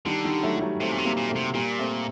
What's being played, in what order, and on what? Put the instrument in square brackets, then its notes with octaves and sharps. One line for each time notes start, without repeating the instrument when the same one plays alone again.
[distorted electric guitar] D3 [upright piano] D#3 G3
[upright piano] D#3 G3
F#3 A3
G3
F#3 A3
[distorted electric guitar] C3 [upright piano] A3 C4
[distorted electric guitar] A#2
C3
[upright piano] G3 A#3
[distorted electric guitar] A#2
[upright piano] A3 C4
[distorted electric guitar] C3
[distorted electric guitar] A#2 [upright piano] G3 A#3
[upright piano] A3 C4